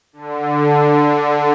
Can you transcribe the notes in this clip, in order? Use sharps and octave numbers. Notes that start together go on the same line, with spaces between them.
D3